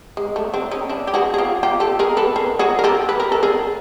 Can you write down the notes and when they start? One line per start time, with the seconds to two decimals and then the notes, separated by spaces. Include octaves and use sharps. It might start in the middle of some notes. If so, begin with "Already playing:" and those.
0.17 G#3
0.36 A3
0.54 C4 D4
0.71 C#4 D#4
0.89 D4 E4
1.07 G4
1.14 F#4 G#4
1.34 G#4
1.38 F4 G4
1.63 F4 G4
1.80 G4 A4
1.99 G#4 A#4
2.17 A4 B4
2.36 G#4 A#4
2.59 F#4 G#4
2.79 A#4
2.84 G4 A4
3.09 B4
3.20 A#4
3.32 A4
3.43 G#4 A#4